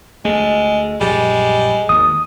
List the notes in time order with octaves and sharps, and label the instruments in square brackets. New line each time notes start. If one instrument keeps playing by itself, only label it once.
[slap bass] D2 A3 [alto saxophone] G#3
[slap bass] A#1 F#2 [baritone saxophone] G3 [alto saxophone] G#3
[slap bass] G#1 D#2 [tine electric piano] D#6